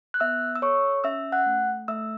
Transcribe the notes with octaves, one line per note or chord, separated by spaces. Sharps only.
F#6
B3 E5 E6
E6
A4 C#5 C#6
C#4 E5 E6
F#5 F#6
A3
A3 E5 E6